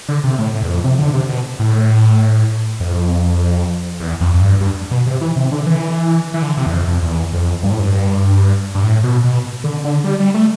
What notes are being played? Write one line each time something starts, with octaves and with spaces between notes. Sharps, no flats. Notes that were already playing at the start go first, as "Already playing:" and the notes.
D3
C3
A2
A2
E2
F2
C3
D3
C3
B2
A2
F2
E2
F2
F2
G2
G2
B2
C3
E3
C3
D3
E3
E3
D3
C3
E2
F2
F2
E2
F2
G2
A2
G2
G2
A2
B2
B2
D3
D3
G3
G3
A3